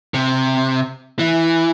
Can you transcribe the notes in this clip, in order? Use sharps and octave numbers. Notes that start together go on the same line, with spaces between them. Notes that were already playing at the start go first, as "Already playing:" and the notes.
C3
E3